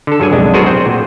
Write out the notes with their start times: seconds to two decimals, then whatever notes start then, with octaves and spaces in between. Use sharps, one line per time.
0.07 D3 A4
0.20 G2 F#3 G#4 G#5
0.32 B1 F2 G#3 D4
0.54 F#3 B3 F#4 G#4 A#4 C5
0.66 C4 C5 F#5
0.86 A#2